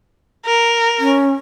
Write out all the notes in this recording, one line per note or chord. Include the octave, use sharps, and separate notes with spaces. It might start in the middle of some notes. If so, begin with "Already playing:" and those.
A#4
C#4